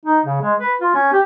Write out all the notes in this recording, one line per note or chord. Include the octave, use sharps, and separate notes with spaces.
D#4
C#3
G#3
B4
F4
C#4
G4